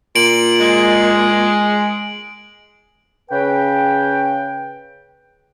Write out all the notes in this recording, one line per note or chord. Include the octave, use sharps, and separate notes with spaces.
A#2 D7 F#7
G#3
C#3 B4 G5